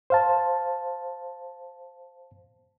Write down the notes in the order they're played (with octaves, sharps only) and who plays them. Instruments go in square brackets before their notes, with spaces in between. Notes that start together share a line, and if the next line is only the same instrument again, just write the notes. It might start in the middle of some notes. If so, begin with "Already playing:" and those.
[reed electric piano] C5 F5 A5